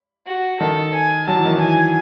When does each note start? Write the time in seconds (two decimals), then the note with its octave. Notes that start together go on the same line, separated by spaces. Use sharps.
0.27 F#4
0.60 D#3 A4
0.94 G#5
1.27 F#3 A5
1.36 E3
1.45 D#3
1.55 E3
1.61 G#5